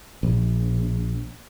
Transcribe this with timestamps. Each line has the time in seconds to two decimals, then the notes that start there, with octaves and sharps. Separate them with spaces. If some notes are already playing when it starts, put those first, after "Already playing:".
0.23 A#1